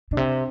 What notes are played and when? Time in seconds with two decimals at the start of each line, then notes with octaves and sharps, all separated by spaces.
0.11 A#2 D4
0.17 C3 C4